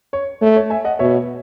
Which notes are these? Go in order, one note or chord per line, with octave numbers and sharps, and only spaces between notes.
C#5
A3 C#5
C#5
E5 G#5
D#5 F#5
B2 C#5 E5